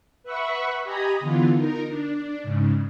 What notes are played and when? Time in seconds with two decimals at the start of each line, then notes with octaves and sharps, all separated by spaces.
0.23 B4 E5 F#5 B5 C#6
0.84 G4 D#5 G#5 A#5 B5 D#6
1.20 D3 E3 B3 F4
1.56 D#4 A#4
1.88 D4
2.43 G#2 C#3